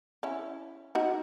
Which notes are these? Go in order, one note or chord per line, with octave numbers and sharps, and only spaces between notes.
C#4 E4
D#4 F#4